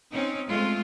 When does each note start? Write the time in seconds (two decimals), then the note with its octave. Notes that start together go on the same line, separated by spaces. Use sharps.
0.11 C4 C#4 D#4
0.48 G#3 A3 C4 F4